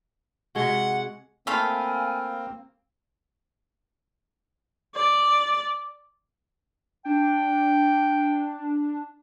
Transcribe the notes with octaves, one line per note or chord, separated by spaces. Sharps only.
C3 G#3 F#4 F#5
A3 A#3 C4 F4 F5 G#5 B5
D5
D4 G5